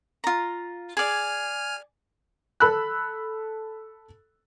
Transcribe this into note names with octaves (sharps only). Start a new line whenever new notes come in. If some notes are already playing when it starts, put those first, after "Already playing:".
F4 A#5
G#4 D5 G#5 F6
A4 B5 E6 F#6